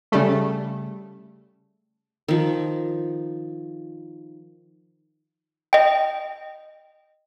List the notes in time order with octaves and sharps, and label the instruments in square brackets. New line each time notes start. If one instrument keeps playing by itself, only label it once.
[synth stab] C#3 G3 A3
[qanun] D#3 F3
[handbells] D#5 G5